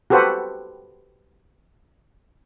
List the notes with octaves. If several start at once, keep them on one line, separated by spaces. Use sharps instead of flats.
F#4 G4 A4 B4 C5 F#5